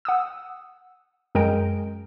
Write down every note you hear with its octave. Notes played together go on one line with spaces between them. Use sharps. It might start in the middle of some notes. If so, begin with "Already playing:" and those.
F#5 D#6 E6
F#2 G#3 A#4 G5 D7